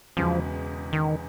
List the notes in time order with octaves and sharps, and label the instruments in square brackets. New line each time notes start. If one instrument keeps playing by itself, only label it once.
[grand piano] E1 E2 C#3 E3 [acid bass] F3
[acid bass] D#3